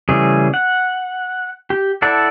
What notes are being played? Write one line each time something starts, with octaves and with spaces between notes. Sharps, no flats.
C#3 E3 G3 A3 G#4
F#5
G4
E4 A4 D5 F#5 A5